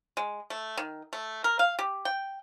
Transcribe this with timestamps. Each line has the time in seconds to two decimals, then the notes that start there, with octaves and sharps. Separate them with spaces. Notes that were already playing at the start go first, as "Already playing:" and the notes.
0.17 G#3
0.50 A3
0.77 D#3
1.13 A3
1.44 A#4
1.59 F5
1.79 G4
2.05 G5